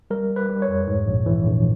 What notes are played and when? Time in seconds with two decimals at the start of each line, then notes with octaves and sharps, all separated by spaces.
0.10 G3 A#4
0.30 G3
0.36 B4
0.49 G3
0.62 C#5
0.68 F2
0.87 G#2
1.06 A#1
1.26 E3
1.45 A#1